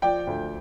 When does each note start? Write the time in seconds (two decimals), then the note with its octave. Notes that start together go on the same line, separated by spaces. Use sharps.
0.02 F3 D5 G5
0.27 D2